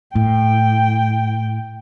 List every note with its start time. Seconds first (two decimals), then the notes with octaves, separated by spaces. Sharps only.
0.15 A2 G5